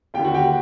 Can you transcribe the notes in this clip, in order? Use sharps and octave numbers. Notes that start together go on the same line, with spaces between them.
D#2 D3 G4 G5
F#4 F#5
G4 G5